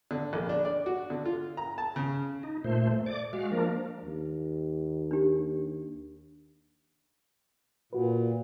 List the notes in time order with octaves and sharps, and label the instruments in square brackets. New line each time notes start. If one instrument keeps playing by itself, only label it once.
[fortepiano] D3
A#1
D4
D5
F#4
D3
F4
A#5
A5
C#3
[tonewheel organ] D#4
A#2 A3 C5
A3
D5 D6
G#3 F#4 F5
F3 A#3 D4 A#4
[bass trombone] D#2
[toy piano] D4 G4
[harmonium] A#2 [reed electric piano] F#4 B4